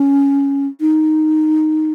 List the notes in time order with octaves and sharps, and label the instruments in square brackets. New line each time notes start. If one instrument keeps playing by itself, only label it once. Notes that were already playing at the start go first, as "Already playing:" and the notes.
Already playing: [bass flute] C#4
D#4